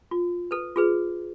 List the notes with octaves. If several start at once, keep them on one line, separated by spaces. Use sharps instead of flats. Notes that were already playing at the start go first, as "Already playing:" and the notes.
F4
A4 B4
F4 G#4 B4